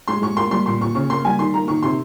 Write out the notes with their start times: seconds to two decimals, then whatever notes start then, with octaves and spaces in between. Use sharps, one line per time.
0.08 G#3 C6
0.22 G#3 C#6
0.36 A#3 C6
0.51 G3 C6
0.66 A#2 C6
0.81 A#2 C#6
0.95 C#3 C#6
1.10 A#3 C6
1.25 G3 G#5
1.39 D#3 C6
1.54 A#3 A#5
1.68 D#3 C#6
1.83 C3 C6